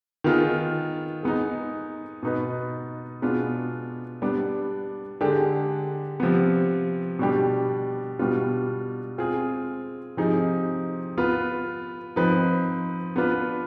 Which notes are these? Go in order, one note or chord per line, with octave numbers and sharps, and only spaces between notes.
D#3 B3 F4 G#4
G#3 B3 D#4
B2 B3 D#4 B4
B2 G#3 B3 D4 F4
G3 B3 D4
D3 G#3 D4 G4
C3 F3 B3
B2 G3 D4 G4
B2 G3 B3 D4 F4
G#3 C4 F4 G#4
C3 F3 C4 D#4 G#4
B3 F4 B4
F3 C4 D#4 B4
B3 D4 F4 B4